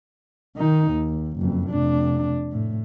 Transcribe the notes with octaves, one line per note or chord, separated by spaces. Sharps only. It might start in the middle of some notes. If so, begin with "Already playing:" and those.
D#3 D#4
D#2
F#1 F2
F1 D4
A2